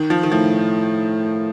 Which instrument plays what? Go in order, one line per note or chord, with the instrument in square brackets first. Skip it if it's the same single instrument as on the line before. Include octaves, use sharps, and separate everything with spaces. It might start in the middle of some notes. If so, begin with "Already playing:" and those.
Already playing: [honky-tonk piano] D#3
F3
D#3
[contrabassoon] A2 [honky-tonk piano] F3